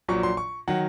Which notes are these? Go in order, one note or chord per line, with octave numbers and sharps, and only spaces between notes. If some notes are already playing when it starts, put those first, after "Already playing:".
A#1 A#2 F#3 C#6
C6
C#6
D#3 F#3 F#5